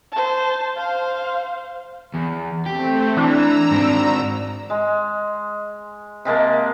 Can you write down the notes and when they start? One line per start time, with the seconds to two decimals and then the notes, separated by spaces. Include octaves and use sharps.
0.12 C5 A5
0.76 C5 F5
2.14 E2
2.66 A3 C4 G4
3.17 E3 D4 A#5 E6
3.71 G#2 C4
4.70 G#3
6.25 C3 G#3 A#3 A5